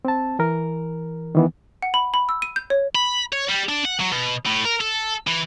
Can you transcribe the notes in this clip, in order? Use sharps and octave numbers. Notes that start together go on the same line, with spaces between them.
C4 A5
E3 A#4
D#3 E3 B3
F#5
B5
B5
E6
D#7
G6
C#5
B5
C#5
G3
D4
F#5
F#3
B2
A2
A#4
A4
E3